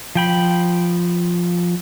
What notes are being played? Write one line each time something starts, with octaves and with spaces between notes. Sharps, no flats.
F3 G5 B5